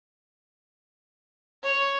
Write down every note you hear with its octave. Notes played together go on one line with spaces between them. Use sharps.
C#5